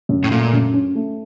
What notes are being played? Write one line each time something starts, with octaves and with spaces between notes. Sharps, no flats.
F#2
A2
A#2 A3
F#2
C#4
A3